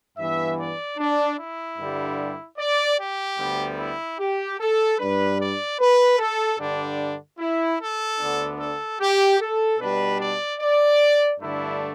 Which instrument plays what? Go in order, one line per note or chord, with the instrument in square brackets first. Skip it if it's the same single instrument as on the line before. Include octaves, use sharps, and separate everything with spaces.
[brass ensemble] G2 E3 B3 E5
D5
D4
E4
G2 D3 G3
D5
G4
D2 D3 G3 B3
E4
G4
A4
G2 G3 D4 B4
D5
B4
A4
G2 D3 G3 D4
E4
A4
D2 D3 B3 D4
A4
G4
A4
B2 G3 D4 B4
D5
D5
G2 D3 A3 D4 E4